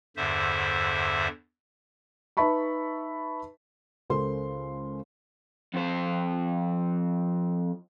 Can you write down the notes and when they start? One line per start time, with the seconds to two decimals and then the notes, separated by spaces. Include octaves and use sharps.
0.17 E2 G2 D3 C5 E5
2.37 D#4 B4 E5 A5 B5 C#6
4.10 C#2 C#3 A4 A#4 C5 C6
5.74 F2 C5